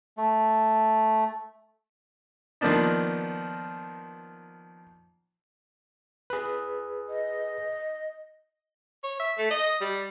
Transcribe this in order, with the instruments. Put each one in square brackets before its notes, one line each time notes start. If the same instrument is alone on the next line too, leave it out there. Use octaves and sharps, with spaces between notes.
[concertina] A3
[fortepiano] D#3 F3 A#3 B3 D4 D#4
[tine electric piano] G#4 B4
[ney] D#5
[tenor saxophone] C#5
E5
A3
D#5
G3